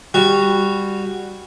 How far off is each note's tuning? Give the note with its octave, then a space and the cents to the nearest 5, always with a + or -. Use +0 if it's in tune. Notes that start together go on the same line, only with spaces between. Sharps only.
G3 +10 F#4 +0